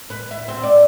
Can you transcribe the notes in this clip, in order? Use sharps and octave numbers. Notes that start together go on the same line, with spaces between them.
B4
E4
C4
D5